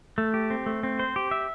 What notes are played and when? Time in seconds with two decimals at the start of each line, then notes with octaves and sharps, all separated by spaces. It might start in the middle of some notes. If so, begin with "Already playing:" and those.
0.18 A3
0.34 G4
0.50 C4
0.66 A3
0.83 C4
0.99 C5
1.16 G4
1.31 E5